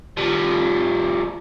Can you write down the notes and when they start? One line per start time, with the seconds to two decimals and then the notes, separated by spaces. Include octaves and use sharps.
0.17 F3 G3